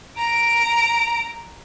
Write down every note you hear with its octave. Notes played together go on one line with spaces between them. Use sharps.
A#5 D7